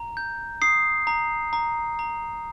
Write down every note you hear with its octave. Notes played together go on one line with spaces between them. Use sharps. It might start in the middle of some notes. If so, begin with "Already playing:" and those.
Already playing: A#5
G6
D#6 C7
A#5
A#5
A#5